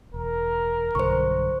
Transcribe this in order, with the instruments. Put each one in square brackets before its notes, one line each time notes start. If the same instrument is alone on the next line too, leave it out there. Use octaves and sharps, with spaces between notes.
[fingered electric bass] E1 [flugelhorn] A#4
[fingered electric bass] B1 G2 D3 [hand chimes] C5 C#6